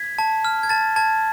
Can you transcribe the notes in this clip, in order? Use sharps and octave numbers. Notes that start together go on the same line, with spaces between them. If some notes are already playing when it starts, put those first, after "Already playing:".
Already playing: G#6 B6
A5
F6
G#6
A5 A6
A5 G#6